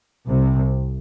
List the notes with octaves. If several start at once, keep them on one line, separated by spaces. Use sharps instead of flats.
C2 C3